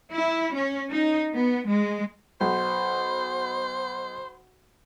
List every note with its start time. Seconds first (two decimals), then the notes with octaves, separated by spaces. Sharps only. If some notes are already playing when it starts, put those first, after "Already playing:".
0.13 E4
0.54 C#4
0.91 D#4
1.35 B3
1.68 G#3
2.41 B1 C5